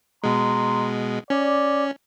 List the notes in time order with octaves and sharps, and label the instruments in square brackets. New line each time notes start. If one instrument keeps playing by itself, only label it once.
[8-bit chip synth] B2 G#3 [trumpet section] A#5 C6
[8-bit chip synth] C#4 [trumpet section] D5